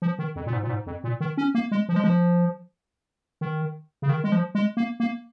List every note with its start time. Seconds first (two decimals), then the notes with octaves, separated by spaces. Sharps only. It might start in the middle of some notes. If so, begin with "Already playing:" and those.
0.02 F3
0.19 D#3
0.36 F2
0.46 A#2
0.53 G#2
0.63 A#2
0.70 G#2
0.86 F2
1.04 A#2
1.20 D#3
1.37 C#4
1.55 A#3
1.71 G#3
1.89 F3
1.96 G#3
2.04 F3
3.41 D#3
4.02 C#3
4.09 D#3
4.24 G#3
4.32 F3
4.55 G#3
4.77 A#3
5.00 A#3